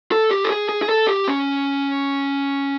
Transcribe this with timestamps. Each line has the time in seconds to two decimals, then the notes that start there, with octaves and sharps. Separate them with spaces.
0.12 A4
0.31 G4
0.44 A4
0.50 G#4
0.69 G#4
0.82 G#4
0.89 A4
1.07 G4
1.28 C#4